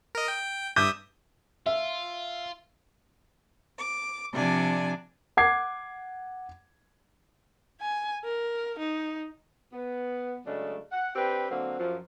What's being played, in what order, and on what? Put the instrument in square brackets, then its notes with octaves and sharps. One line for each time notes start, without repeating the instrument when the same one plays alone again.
[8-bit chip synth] A#4 D#5
G5
[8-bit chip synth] G2 E5 D#6 [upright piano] D6 G6
[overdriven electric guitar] F4 [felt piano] E5
[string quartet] D6
C3 F3 D4 D5 G#5
[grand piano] F#5 D6 G#6 C7
[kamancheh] G#5
A#4
D#4
[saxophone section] B3
C#3 F#3 G#3 A3 D4
F#5
C4 D4 G4 B4
D3 F#3 A#3 C4 F#4
F#2 F3